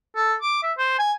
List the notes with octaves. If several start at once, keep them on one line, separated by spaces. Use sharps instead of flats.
A4
D6
E5
C5
G#5